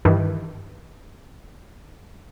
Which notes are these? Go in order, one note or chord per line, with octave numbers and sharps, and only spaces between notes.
G2 D#3 E3